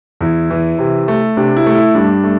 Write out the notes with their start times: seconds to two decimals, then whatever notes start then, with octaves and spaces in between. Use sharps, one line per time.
0.21 E2 E4
0.50 E3
0.79 C3
1.08 A3
1.37 C3 D4
1.57 E4
1.66 A3
1.75 E4
1.95 G2 D4
2.24 A3